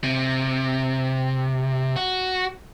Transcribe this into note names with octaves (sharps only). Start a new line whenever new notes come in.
C3
F#4